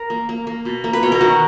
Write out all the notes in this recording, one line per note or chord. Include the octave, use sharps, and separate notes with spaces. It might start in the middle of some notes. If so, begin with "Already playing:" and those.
Already playing: A#4
A#3
A#3
A#3
B2
A#3
B4
B2 C#5
A#4
D#3 F#4